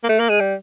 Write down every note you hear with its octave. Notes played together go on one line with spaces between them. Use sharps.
A#3
A3
A#3
G#3
G3